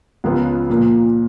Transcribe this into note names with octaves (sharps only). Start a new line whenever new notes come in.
C#2 C#3 F3 B3 F4
A#2 F3 A#3